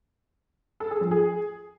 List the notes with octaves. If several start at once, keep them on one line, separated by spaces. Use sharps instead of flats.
A4
G#4
F3
G#4